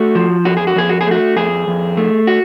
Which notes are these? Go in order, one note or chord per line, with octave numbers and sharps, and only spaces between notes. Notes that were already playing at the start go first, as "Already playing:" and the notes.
Already playing: A3 F#4
F3
F2 F#4
G#4
F#4
F2 G#4
F#4
G#4
A3 F#4
F2 G#4
F2
A3
F#4